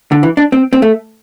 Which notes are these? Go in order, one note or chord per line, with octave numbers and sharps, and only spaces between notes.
D3
E3
D4
C4
C4
A3